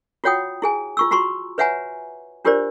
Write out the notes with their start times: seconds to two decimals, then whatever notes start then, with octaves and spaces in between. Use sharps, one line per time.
0.24 F4 F#4 C#5 F#5 G5 D#6
0.62 E4 G#4 G#5
0.97 F4 C#6 E6
1.11 F4 F#4 A#5 C6 C#6
1.58 B4 C#5 E5 F#5 G#5 A#5
2.45 D4 F4 G4 A#4 C5 D5